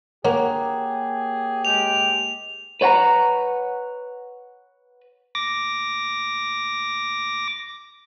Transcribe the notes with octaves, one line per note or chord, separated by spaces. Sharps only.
A#3 G4 G#4 C#5 F#5
G#3 G4 F7
B4 C#5 F#5 G5 A#5
D6 A#6